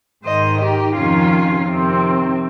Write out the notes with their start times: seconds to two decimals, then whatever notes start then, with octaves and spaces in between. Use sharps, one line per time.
0.24 G#2 D#3 C5 D#5
0.59 D#4 G4
0.95 F2 C3 D#3 C#4 F4
1.67 F2 C3 D#3 C4